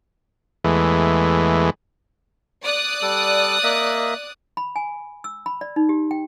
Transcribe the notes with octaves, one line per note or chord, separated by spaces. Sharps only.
E2 E3 G#3 A3
D5 D#6 F#6
G3 A4
A#3 D#5 E5
B5
G#5
E6
B5
D5
D#4
G4
G5